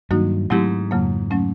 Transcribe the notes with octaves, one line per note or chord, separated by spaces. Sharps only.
G2 D#3 F#3 A#3 D#4 F#4
G#2 F#3 A3 C4 E4 G4
F2 C#3 F#3 A#3
F#3 A3 C#4